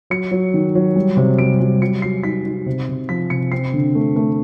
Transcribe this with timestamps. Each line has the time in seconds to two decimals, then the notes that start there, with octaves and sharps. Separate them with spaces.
0.10 F#3 C#7
0.31 F#3
0.54 D#3
0.75 F#3
0.96 G3
1.17 C3
1.39 G3 D7
1.61 G3
1.82 F#3 C#7
2.02 F#3 C7
2.23 D#4 B6
2.45 D#4
2.66 C3
2.89 C3
3.09 F3 B6
3.30 C3 C#7
3.52 C4 C7
3.74 D3
3.95 A3
4.16 A3